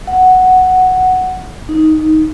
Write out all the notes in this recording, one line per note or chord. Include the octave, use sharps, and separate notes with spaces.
F#5
D#4